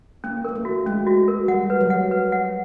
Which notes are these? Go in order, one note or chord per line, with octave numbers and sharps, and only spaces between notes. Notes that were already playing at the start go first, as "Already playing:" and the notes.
A#3 C#4
A#3 A#4
A3
F#4
G#3 C#4
F#4
A#4
G3 F#5
B4
F#3
F#5
B4
F#5